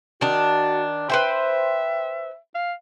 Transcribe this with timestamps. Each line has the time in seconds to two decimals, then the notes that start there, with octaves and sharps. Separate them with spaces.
0.21 D#3 D4 F#4
1.10 B4 C5 E5 G5
2.55 F5